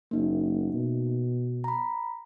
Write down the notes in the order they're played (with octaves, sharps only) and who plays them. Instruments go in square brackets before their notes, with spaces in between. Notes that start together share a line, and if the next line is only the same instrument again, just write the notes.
[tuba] F#1 [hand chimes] A#3 D#4
[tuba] B2
[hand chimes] A#5 B5